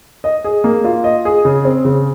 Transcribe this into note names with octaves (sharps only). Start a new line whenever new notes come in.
D#5
G#4
A#3
F4
D#5
G#4
C#3
C4
C#3